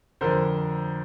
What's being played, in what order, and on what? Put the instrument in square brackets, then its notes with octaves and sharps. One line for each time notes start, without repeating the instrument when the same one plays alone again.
[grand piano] F2 D3 A#4 C5